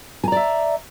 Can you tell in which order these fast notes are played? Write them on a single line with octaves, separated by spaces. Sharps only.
G#5 A#5 D5 E5